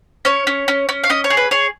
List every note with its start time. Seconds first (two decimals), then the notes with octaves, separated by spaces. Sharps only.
0.25 C#4 C#5
0.47 C#4
0.68 C#4
0.89 C#4
1.04 F5
1.10 C#4 D#5
1.24 C#5
1.30 G#4
1.37 B4
1.51 G#4 C#5